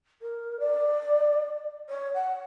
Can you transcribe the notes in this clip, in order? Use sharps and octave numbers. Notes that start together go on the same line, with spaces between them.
A#4
D5
C#5
F#5